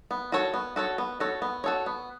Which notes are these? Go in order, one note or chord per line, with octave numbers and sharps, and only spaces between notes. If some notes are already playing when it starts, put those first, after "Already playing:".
B3
F#4 A4 C#5
B3
F#4 A4 C#5
B3
F#4 A4 C#5
B3
F#4 A4 C#5
B3